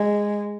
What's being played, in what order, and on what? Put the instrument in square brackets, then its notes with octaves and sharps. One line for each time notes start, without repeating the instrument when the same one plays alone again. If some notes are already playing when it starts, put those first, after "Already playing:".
Already playing: [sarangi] G#3